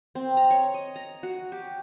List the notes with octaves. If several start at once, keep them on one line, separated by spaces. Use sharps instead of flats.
C4
A#5
C#5
D#5
A#5
F#4
G4